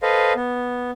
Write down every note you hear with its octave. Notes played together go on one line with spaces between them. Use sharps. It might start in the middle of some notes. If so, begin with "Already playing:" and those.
A4 B4 C5 D#5 F5
B3